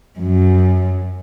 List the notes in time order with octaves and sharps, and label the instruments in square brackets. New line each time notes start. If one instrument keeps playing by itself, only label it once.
[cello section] F#2